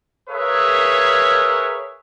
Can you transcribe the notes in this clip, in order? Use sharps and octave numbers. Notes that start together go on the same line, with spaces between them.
G#4 A#4 B4 C#5 E5 F5